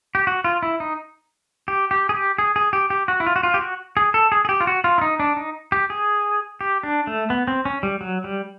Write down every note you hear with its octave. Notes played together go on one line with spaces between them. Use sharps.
G4
F#4
F4
E4
D#4
G4
G4
G#4
G4
G#4
G#4
G4
G4
F#4
E4
F4
F#4
F4
G4
F#4
G#4
A4
G#4
G#4
G4
F4
F#4
F4
E4
D#4
D4
D#4
G4
G#4
G4
D4
A3
B3
C4
C#4
G3
F#3
G3